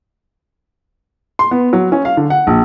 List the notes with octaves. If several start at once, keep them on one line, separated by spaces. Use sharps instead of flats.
C6
B3
F#3
C#4
F5
D3
F#5
A#1